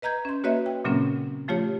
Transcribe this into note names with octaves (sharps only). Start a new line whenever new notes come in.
B4 D#5 A#5 G6 G#6
C#4 C6
A#3 F#4 B4 C#5 D#5 E5
G5
A#2 C#3 F#3 A#3 C4 C#4
F3 A3 F4 G4 C#5